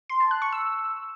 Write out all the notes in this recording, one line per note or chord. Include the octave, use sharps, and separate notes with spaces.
C6
A5
F#6
C#6
E6